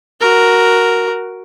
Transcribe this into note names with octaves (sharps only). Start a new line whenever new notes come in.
F#4 A#4